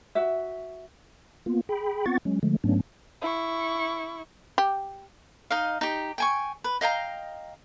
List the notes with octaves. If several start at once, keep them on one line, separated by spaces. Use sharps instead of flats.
F#4 E5
A#3 B3 F4
G#4 G5 B5
B3 C4 F4 F#5 C#6 A6
F#3 G#3 C#4
D3 F3 G#3 A3
G#2 F#3 A3 B3 C#4 D4
E4 C#6
G4
D#4 D#5 F5
D#4 G4
G5 G#5 C#6
B4
D#5 F5 G5 A#5